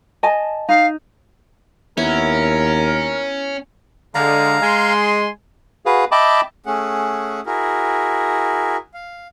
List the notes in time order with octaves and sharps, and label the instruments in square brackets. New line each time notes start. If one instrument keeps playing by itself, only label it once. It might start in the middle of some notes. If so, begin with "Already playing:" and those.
[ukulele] D#5 G#5 A5
[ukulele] D#4 [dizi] F5
[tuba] D#2 [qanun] B3 E4 F#5 [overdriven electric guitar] C#4 [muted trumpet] A#4
[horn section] D3 G#3 [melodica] F5 A#5
[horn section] G#3 G#5 C6
[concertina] F#4 G#4 B4 F5
D#5 E5 G5 A5 B5 D6
[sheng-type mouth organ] A3 C#4 G#4 F#5
E4 F#4 G#4 A#4
F5